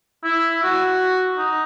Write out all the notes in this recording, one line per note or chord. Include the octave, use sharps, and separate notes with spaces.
E4
F#4
D#4